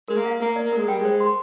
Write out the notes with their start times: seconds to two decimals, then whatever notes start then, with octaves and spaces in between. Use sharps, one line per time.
0.08 G#3 A#4
0.17 A#3
0.25 F5
0.40 A#3 A#4
0.56 D5
0.64 A#3
0.72 G#3 A#4
0.88 G3 G5
0.99 G#3
1.05 C5
1.20 C6